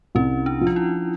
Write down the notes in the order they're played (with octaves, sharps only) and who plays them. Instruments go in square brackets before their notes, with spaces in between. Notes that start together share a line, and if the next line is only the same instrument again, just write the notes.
[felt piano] C2 [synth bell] C#4
[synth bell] D4
[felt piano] F3
[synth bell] F4
E4